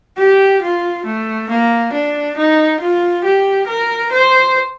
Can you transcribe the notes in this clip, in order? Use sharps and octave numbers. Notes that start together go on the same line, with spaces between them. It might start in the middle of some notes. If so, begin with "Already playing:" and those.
G4
F4
A3
A#3
D4
D#4
F4
G4
A#4
C5